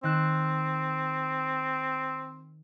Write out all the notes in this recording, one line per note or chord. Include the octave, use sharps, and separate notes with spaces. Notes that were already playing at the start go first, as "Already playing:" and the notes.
D#3 C4 F#6 E7